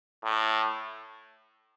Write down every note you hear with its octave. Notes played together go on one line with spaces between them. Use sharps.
A2